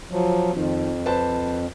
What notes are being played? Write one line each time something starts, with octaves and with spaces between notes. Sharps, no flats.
F3 F#3
F2 D#3 F3
B4 C5 A5